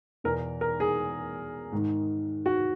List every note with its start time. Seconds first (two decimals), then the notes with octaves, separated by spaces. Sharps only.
0.24 E2 B2 A#4
0.61 A#4
0.80 G#4
1.72 G#2 D#3
2.46 F#4